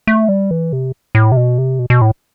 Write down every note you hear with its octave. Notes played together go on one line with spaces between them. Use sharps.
A3
G3
E3
C3
A2
C3
B2
C3
B2
B2
A2